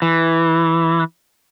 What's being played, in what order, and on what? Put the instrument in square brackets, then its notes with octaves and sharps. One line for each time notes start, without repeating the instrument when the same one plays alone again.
[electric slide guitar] E3